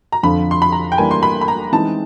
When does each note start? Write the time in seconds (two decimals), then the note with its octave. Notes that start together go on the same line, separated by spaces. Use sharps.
0.12 A#5
0.23 F2 D3 F3 B5
0.51 C6
0.62 B5
0.72 A#5
0.92 G5
0.98 E3 G3 A#3 D4 G#5
1.11 C6
1.23 B5
1.41 B5
1.48 A#5
1.72 E3 G#3 C4 D#4 A5